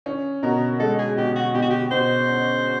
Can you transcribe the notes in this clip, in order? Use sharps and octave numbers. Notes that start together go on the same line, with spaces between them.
C#4
B2 A#4
G#3 A4
G#4
B2 G4
F#4
B2 G4
F#4
G4
B2 C5
C#4